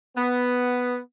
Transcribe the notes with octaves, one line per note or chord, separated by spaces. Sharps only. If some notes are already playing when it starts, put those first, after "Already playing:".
B3